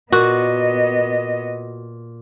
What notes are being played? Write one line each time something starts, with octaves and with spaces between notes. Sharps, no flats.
A#2 B3 F#4 D#5